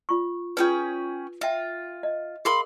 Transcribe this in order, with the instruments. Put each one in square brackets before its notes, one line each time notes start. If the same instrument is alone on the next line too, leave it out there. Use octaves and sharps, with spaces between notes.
[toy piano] F4 C#6
[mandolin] C#4 G#4 G5 [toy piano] F4 B4
[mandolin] F4 [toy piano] E5 G5
[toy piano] D#5
[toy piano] G#4 A#4 [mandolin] F5 B5 C6